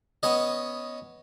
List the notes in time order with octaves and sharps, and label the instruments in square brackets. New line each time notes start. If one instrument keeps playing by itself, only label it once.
[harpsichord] B3 C#4 D#5